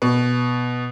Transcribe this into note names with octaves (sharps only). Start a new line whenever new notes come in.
B2